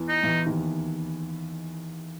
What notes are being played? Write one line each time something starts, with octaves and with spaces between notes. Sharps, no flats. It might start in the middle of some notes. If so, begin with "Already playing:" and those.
Already playing: E2 E3
D#4
E2 E3
D#2 D#3